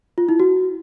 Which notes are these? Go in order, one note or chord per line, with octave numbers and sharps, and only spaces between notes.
F4
E4
F#4